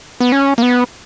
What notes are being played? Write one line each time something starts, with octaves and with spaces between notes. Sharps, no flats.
B3
C#4
A#3
B3